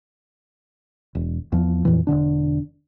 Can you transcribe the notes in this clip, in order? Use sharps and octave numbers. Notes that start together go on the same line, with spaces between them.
E1
E2 F3
F2 A#2 E3
E1 B1 D3 D4